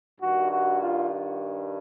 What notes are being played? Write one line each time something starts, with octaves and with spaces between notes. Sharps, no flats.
G2 D#3 F#4
F#4
F4